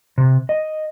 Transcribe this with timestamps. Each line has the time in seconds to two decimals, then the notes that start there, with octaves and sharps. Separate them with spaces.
0.18 C3
0.49 D#5